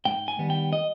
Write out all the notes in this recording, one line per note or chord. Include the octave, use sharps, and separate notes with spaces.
G#2 G5
G#5
D#3 G3 B3
G5
D#5